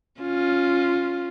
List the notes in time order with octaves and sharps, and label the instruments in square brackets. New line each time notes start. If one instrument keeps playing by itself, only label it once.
[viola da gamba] C#4 F4